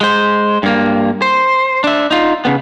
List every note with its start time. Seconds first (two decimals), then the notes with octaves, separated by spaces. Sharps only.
0.01 G#3 C5
0.63 G2 A#3
1.22 C5
1.84 D4 E5
2.11 D#4 F4
2.45 C#3 B3